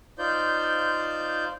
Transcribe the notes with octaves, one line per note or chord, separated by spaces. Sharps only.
D#4 F4 C5 D5 G6